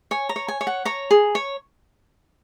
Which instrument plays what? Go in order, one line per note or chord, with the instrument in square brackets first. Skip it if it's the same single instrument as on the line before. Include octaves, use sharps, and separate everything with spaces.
[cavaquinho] C#5 G#5
A#5
C#5
G#5
C#5
F#5
C#5 A#5
G#4
C#5